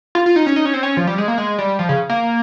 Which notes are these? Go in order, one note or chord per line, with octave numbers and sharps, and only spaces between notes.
F4
F4
D#4
C#4
D#4
C#4
C4
C#4
F3
G3
G#3
A#3
G#3
G3
F3
C#3
A#3